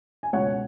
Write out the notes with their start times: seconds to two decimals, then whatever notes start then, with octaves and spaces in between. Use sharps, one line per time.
0.23 G#5
0.33 C#2 B2 C#5 F#5